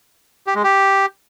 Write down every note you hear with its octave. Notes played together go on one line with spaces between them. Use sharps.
G4
G#3
G4